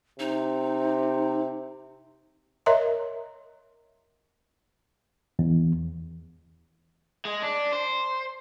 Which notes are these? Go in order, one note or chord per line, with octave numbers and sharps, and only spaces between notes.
C3 D#4
A#4 C#5 D#5 E5 A#5 C6
E2
G#3
D4
C5